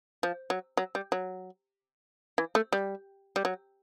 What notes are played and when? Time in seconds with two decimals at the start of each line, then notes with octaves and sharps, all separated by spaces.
0.23 F3
0.50 F#3
0.77 F#3
0.95 G3
1.12 F#3
2.38 E3
2.55 A3
2.73 G3
3.36 G3
3.45 F#3